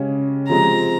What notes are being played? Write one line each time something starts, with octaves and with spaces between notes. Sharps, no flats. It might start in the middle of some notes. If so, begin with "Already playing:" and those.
Already playing: C#3 G#3 C#4 G4
C3 F3 G#3 C4 A#5